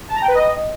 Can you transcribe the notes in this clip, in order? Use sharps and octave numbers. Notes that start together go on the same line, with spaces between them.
A5
A#5
G5
B4
D#5